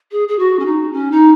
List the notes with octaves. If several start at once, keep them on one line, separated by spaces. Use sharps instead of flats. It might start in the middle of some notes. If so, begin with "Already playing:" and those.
G#4
G#4
F#4
C#4
D#4
C#4
D#4